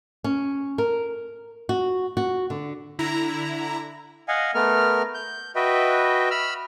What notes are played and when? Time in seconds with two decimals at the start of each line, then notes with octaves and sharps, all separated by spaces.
0.24 C#4
0.78 A#4
1.69 F#4
2.17 F#4
2.50 D3
2.99 D3 E4 A#5
4.28 D#5 F5 F#5 G#5
4.54 A3 B3 A#4 F6
5.14 G6
5.55 F#4 B4 D#5 E5 G5
6.31 B5 E6 F6